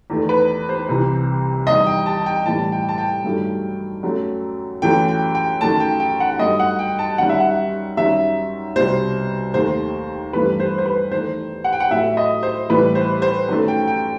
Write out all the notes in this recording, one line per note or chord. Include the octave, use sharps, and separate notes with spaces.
E2 D#3 A3
B4
C5
C2 C3 E3
E2 D#3 G3 D#5
G5
A5
G5
A2 E3 G3 A5
G5
A5
G5
G2 D#3 F#3 A3
F#2 F#3 A3
F#2 E3 A3 G5
G5
G5
F#2 D#3 A3 A5
G5
G5
F#5
G2 D#3 F#3 A3 D#5
F#5
G5
A5
F#2 D#3 G3 F#5
E5
F#5
F#2 D#3 G3 E5
C2 B2 G3 C5
D#2 D#3 A3 C5
G2 E3 A3 B4
C5
C5
B4
E2 D#3 A3 C5
F#5
G5
F#5
A2 F#3 A3 E5
D#5
C5
A2 E3 G3 B4
C5
C5
F#2 D#3 A3
G5
G5